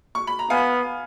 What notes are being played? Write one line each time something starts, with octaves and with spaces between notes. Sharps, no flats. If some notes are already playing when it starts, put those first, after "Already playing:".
C#6
B5
A#5
B3 F5 G#5